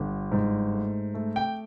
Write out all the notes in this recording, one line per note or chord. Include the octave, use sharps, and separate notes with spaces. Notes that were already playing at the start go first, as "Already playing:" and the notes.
Already playing: G1 D3
G#2
A3
A3
G5